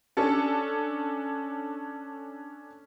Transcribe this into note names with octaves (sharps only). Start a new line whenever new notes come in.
C#4 D4 A4 A5